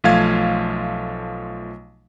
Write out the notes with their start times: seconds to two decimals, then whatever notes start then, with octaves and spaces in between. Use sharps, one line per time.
0.04 B1 F3 A3 F5 G#6